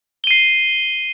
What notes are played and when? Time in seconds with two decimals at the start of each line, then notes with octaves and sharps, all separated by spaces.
0.24 G7
0.27 D#7
0.31 C7